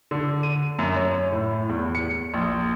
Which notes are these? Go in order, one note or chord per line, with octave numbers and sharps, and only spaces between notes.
D3
D#7
F#2
C#5
A2
E2
C#7
A#1